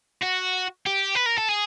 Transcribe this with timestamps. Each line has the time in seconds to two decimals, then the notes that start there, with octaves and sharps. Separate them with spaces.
0.23 F#4
0.86 G4
1.15 B4
1.26 A#4
1.38 A4
1.49 G#4